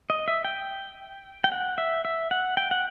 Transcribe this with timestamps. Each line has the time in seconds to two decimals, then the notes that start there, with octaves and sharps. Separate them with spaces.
0.10 D#5
0.28 E5
0.45 G5
1.44 G5
1.52 F#5
1.78 E5
2.05 E5
2.31 F#5
2.57 G5
2.71 F#5